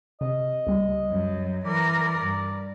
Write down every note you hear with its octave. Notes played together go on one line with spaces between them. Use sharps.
C3 D#5
C#2 G3
F#2 F#3
E3 A#4 D5
G2